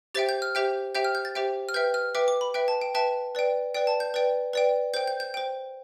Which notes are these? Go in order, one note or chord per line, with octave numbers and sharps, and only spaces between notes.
G4 C5 E5 G5 A6
G6
F6
G4 C5 E5 G5 G6
G4 C5 E5 G5 G6
F6
G6
A6
G4 C5 E5 G5
F6
B4 E5 G5 G6
F6
B4 E5 G5 D6
D6
B5
B4 E5 G5
A5
G5
B4 E5 G5 A5
B4 D5 G5
B4 D5 G5
A5
G6
B4 D5 G5
B4 D5 G5
C5 G5 G6
G6
G6
C5 G5